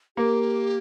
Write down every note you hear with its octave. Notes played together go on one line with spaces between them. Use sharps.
A#3 G4